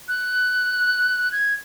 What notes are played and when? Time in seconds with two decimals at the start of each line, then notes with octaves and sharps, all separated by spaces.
0.08 F#6
1.32 G#6